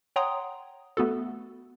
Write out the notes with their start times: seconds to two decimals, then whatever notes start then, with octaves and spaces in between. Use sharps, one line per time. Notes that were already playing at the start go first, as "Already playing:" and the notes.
0.16 C#5 F#5 G5 A#5 C6 D#6
0.97 A3 B3 F#4 A4